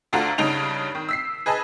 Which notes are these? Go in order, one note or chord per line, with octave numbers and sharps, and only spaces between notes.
D2 D4 F4 F#4 A4 A#5
G2 C#3 D4 D#4 F7
D#3
E6 B6 C7
G#4 B4 D#5 G#5 A5